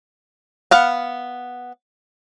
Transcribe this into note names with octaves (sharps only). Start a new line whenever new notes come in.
B3 F5 F#5